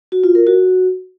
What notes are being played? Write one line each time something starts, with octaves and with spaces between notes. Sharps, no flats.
F#4
F4
A#4
F#4